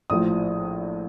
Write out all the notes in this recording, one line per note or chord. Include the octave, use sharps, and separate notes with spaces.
A#1 A2 F3 D#6